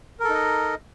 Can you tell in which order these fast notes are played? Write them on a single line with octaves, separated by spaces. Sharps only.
A#4 A4 D#4 D#5